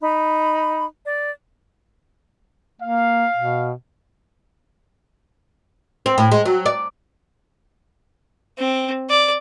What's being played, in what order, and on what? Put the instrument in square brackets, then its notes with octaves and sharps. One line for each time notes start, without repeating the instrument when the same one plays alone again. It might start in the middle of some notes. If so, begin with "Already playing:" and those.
[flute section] D#4 B5
D5
[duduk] A#3 [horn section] F5
[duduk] B2
[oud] C4
A2
G#3
F#3
D5
[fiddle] C4
D5